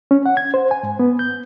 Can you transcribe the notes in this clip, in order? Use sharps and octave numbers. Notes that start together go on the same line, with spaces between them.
C#4
F#5
G#6
C5
G#5
G#2
B3
G6